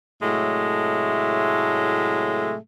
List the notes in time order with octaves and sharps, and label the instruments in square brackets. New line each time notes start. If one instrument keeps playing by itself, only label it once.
[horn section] A2 C3 F#3 G#3 A3